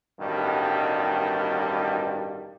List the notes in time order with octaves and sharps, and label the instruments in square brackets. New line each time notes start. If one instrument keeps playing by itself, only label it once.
[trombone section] A1 G2 B2 D#3 G3